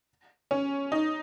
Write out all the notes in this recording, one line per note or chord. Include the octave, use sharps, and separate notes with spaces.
C#4
D#4